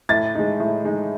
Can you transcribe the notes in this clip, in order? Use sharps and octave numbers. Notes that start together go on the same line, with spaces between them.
A2 A6
G#3 D#4
A2
G#3 D#4